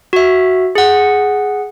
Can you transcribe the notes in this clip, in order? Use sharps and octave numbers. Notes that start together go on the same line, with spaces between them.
F#4 E5
G#4 F#5